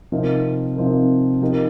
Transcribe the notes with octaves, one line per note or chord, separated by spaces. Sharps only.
C3 F3 C4 D#4 A#4
C3 F3 C4 D#4 A#4
F3 D#4 G4 A#4